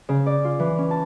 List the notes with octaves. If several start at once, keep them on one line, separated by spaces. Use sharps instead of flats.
C#3
D5
F4
E3
C#4
A5